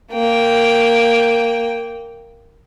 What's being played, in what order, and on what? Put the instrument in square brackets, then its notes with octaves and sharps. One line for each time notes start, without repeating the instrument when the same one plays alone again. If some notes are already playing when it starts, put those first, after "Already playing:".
[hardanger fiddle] A#3 G5